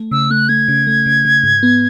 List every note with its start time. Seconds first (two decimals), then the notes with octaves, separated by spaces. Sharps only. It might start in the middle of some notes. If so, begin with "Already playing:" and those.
Already playing: A3
0.11 C#3 E6
0.30 A3 F#6
0.49 A3 G#6
0.68 C#3
0.87 A3
1.06 C#3
1.25 C#3
1.44 G#2
1.63 B3